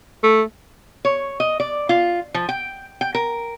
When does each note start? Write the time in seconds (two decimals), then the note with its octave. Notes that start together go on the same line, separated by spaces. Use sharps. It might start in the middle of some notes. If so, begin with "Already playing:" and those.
0.23 A3
1.05 C#5
1.40 D#5
1.60 D5
1.89 F4
2.34 F3
2.49 G5
3.01 G5
3.15 A#4